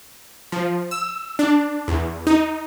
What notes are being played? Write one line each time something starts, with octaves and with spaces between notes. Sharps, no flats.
F3
E6
D4
E2
D#4